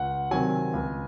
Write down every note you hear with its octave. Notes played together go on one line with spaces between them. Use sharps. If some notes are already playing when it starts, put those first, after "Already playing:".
Already playing: C#2 F#5
C3 D#3 F#3 G#5
C#2